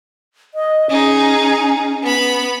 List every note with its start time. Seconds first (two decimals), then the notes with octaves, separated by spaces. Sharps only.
0.54 D#5
0.90 C#4 D#4 G#4
2.03 B3 B5